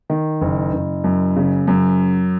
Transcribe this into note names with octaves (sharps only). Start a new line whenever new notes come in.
D#3
F#1
F#1
F#2
C#3
F#2